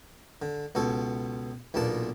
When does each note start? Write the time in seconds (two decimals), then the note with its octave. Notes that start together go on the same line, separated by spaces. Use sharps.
0.42 D3
0.75 C#2 B2 A4 C#5
1.74 B1 E2 A#2 D4 A5